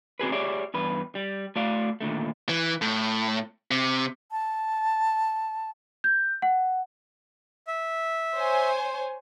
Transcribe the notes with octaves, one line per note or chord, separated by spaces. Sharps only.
C4 F#4 G#4 B4
G4 G#4 C#5 D5 E5
E2 G2 B4
G3
A3 F#4 D5 F5
D#2 A#2 D3 A3
E3
A2
C3
A5
G6
F#5
E5
C5 C#5 G#5